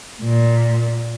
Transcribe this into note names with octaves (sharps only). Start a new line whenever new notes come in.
A#2